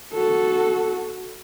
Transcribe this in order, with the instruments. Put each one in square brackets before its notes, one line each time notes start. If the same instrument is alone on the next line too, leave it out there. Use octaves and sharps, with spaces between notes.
[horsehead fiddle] F#4 A4